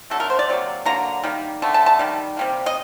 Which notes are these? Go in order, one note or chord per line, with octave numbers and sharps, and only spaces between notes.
D3 F#3 A3 A4
A#4
C5
D5
C3 F#3 A#3
D3 F#3 A#3 A#5
D#3 G3 A#3
D3 A3 A5
A5
A5
D#3 G3
C3 G3 A#3
D#5